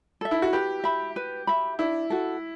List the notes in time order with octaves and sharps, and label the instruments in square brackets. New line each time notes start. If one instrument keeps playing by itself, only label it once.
[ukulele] A4 E5
[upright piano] E4
F#4
[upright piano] G4 [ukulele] B4
[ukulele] E5 B5
B4
E5 B5
[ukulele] D4 [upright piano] E4
[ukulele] F#4 A4